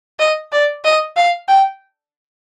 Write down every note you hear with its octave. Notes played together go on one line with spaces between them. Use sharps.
D#5
D5
D#5
F5
G5